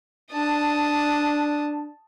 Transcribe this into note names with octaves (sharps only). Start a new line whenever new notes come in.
D4 A5 D#6